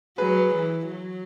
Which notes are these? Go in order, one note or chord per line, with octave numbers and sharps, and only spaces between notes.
F#3 G#4 B4
E3
F#3